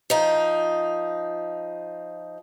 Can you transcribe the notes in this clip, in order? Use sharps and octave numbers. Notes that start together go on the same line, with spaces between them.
F3 D#4